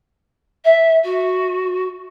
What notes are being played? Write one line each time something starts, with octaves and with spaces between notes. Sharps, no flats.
E5
F#4